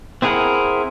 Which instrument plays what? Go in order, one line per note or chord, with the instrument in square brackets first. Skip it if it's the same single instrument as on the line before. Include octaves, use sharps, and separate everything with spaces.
[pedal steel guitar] C4 E4 G#4 A#4 F#5